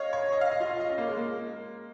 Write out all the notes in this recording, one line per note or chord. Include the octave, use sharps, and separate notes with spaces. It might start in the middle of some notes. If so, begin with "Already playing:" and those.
Already playing: C#5 D#5 F5
C#5
D#5
F5
D#5
F4
F5
D#5
C#4
A#3
G#3
A#3